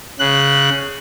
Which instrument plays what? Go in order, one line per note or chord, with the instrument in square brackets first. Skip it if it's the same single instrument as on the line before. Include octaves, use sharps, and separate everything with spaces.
[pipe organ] C#3 F#6